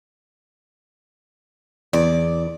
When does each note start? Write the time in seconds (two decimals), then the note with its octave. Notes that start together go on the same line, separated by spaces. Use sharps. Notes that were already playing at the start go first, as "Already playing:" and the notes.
1.93 E2 D5